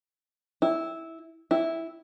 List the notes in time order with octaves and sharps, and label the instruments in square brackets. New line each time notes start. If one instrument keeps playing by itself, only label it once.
[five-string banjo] E4
E4